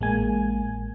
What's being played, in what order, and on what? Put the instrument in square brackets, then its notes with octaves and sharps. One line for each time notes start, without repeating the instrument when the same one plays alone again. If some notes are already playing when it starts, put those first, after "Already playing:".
[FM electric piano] A1 G#3 A#3 G#5